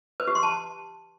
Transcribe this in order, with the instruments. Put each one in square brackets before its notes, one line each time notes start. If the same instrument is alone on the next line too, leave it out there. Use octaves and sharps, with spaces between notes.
[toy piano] B4
G4
C6
A5